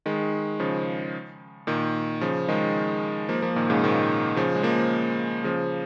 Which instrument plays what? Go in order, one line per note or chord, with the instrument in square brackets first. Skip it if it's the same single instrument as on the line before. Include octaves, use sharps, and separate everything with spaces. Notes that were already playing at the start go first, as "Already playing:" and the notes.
[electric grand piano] D#3 G#3
C#3 F3
A#2 D#3
C#3 F3
D#3 G#3
F3 A#3
F3 A#3
A#2 D#3
G#2 C#3
A#2 D#3
C#3 F3
G#3
F3 A#3
C#3 F3